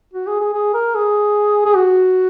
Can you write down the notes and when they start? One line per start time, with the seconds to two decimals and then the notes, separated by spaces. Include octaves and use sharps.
0.14 F#4
0.27 G#4
0.41 G#4
0.54 G#4
0.74 A#4
0.95 G#4
1.65 G#4
1.76 F#4